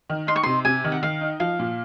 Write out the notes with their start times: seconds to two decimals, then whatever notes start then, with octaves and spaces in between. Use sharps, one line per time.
0.10 D#3
0.27 D#4 C6
0.36 C#6
0.43 C3 C6
0.65 C3 G#5
0.84 D#3
0.92 F#5
1.03 D#3 F5
1.21 D#4
1.40 F3 F5
1.59 A#2